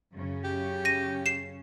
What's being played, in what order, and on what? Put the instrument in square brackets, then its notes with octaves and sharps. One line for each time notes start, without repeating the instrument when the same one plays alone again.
[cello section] F#2 C#3 C#4
[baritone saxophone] G4
[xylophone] A#6 D#7
C7 E7